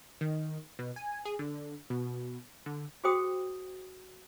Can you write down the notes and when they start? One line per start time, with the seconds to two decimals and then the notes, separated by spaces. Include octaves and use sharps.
0.21 D#3
0.79 B2
0.96 G#5
1.25 G#4
1.39 D3
1.90 B2
2.66 D3
3.04 F#4 G#4 C5 G5 D#6